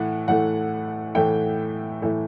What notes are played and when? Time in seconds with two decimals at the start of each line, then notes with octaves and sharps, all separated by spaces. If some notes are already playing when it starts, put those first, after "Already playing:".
Already playing: A2 E3 F#5
0.28 A2 E3 A3 F#5
1.15 A2 E3 A3 G5
2.02 A2 E3 A3